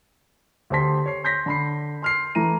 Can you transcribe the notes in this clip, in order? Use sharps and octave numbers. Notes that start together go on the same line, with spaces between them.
D2 G4 C5 A5 C6 B6
C#5 C7
C6 G6 A#6 B6
D3 B5 C7
C6 F6 C7
E3 A3 A#5 D#7